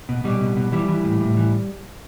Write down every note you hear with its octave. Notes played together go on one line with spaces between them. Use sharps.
B2
B2 G3
B2
B2
E3 G3
E3
A2
A2
E3